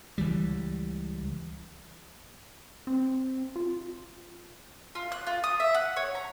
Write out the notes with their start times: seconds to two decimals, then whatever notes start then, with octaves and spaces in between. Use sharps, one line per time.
0.18 C#2 E3 G3
2.87 C4
3.56 F4
4.95 F4
5.12 F#6
5.27 F4
5.44 D#6
5.60 E5
5.74 F#5
5.96 C#5
6.15 A#5